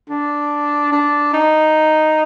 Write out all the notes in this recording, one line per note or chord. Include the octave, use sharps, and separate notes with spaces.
D4
D4
D#4